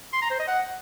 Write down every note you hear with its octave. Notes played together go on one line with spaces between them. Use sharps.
C6
A#5
C5
D#5
F#5